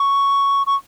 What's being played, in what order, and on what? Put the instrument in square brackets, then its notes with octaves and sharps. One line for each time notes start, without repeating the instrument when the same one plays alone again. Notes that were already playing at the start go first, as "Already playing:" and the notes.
Already playing: [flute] C#6
C#6